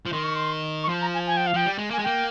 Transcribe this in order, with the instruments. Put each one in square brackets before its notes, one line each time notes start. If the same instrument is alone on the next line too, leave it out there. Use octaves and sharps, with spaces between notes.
[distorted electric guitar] F3
[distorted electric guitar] D#3 [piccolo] C6
[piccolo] C#6
C6
C#6
[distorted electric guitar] F3 [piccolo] C6
[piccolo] A#5
G#5
G#5
G5
F5
[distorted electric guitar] F3 [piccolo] G5
[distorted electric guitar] G3
G#3
[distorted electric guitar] A#3 [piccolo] G#5
[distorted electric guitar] G#3
[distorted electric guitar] A#3 [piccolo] G5